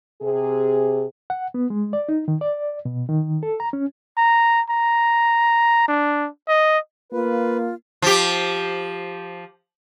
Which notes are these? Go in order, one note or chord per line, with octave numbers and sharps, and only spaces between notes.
C3 G#4
F#5
B3
G#3
D5
D#4
D#3
D5
B2
D#3
A4
A#5
C#4
A#5
A#5
D4
D#5
A#3 F4 B4
F3 G4